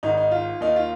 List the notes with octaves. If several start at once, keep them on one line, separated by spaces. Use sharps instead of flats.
G#1 G#2 D#3 D#4
D#4
F4
D#2 D#3 D#4
F4